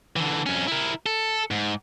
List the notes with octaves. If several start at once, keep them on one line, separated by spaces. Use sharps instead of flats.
D3 E3
F2 C#4
E4 A#4
A4
G#2